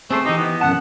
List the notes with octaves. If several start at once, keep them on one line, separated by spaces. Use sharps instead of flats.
A3 C4 G#4 C5
E3 D#4 G4
B3
B1 F#2 E3 F#5 A5